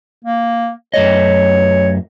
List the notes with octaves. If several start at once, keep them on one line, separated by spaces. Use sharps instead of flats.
A#3
F#2 A3 C#5 D#5